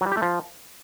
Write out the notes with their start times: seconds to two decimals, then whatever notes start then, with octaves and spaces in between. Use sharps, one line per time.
0.01 F#3
0.06 G3
0.12 G4
0.17 A3
0.22 F3